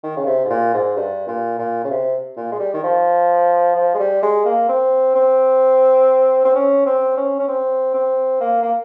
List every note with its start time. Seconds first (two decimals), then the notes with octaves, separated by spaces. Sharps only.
0.03 D#3
0.16 C#3
0.26 C3
0.44 G#2
0.50 A#2
0.74 G#2
0.96 G2
1.27 A#2
1.59 A#2
1.84 C#3
1.90 C3
2.36 A#2
2.52 G#3
2.59 G3
2.74 D#3
2.83 F3
3.75 F3
3.94 G#3
3.99 G3
4.22 G#3
4.45 A#3
4.69 C4
5.15 C4
6.45 C4
6.55 C#4
6.86 C4
7.17 C#4
7.39 C#4
7.48 C4
7.94 C4
8.40 A#3
8.62 A#3